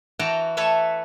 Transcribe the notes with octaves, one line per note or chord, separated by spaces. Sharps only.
E3 F#4 G5 A5 A#5
A3 A4 B4 C#5 E5